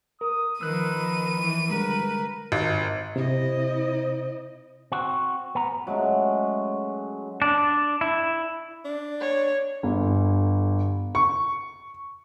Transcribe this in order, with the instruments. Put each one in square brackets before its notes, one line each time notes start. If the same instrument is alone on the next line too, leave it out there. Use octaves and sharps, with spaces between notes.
[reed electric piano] A#4 [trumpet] D#6
[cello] D#3 F3 [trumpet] B4 [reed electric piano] E6 F#6 [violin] D#7
[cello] E3
[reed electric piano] D3 G3 G#3 [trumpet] A#4 [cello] B4
[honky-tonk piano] G#1
[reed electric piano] C3 [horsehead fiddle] E4 D#5 [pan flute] C5
[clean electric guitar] C4 F#4
B3 A#5
[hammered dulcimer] F#3 G#3 A3 C#4
[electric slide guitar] D4
E4
[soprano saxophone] D4
[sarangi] C#5
[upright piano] G1
C#6